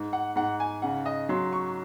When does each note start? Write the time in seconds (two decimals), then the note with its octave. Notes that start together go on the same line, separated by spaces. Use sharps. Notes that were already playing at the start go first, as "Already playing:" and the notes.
Already playing: G#2
0.13 F#5
0.36 G#2 F#5
0.60 G#5
0.82 C#3 F#5
1.06 D#5
1.29 F#3 C6
1.52 C#6